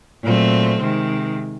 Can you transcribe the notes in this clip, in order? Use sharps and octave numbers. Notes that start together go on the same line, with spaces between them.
A#2 F#3 A3 C4
C3 D#3 G#3